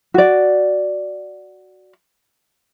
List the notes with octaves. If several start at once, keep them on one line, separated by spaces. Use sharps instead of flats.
F#4 D5